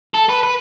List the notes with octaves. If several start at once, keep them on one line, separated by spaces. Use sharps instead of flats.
A4
B4
B4